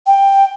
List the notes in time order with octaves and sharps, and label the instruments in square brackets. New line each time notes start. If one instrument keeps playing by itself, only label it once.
[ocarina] G5